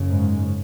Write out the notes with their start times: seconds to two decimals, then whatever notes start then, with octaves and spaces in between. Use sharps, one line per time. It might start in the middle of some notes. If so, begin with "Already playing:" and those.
Already playing: F#1 F#2 C#3
0.08 G#2 G#3